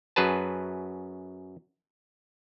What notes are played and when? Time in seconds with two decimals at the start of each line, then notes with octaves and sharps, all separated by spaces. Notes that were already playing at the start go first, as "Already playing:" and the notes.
0.16 F#2 F#3 G#4 B4 A5